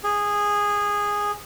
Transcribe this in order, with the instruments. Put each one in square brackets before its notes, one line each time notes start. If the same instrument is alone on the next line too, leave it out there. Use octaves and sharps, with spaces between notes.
[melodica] G#4